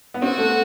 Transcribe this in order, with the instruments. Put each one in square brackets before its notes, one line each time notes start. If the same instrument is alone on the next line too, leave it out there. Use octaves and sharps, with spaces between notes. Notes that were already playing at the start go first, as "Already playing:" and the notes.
[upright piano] B3
[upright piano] C4 [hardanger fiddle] F#4
[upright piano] A3